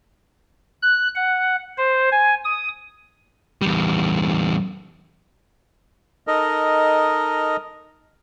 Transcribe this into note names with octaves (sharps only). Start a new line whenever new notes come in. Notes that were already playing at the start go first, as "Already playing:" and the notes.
F#6
F#5
C5
G#5
D#6
E2 G3
D#4 A4 A#4 D#5